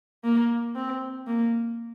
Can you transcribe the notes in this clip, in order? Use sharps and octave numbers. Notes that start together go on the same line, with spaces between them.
A#3
C4
A#3